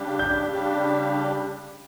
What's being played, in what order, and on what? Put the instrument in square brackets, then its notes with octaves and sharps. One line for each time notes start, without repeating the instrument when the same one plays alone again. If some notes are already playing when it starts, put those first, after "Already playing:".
Already playing: [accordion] C#3 G3 D4 G4
[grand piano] G6
[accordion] C#3 G3 D4 G4